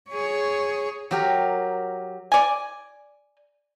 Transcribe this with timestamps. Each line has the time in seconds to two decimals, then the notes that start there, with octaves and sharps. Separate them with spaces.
0.10 G#4 C#5
1.11 F#3 G4 A#4
2.32 D5 G#5